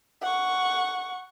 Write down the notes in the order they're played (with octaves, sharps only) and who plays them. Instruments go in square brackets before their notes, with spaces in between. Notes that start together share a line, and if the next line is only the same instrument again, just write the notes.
[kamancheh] F#5 C#6